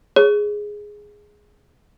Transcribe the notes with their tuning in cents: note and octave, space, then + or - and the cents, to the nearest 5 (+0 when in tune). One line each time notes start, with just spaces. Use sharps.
G#4 +0 C#5 +0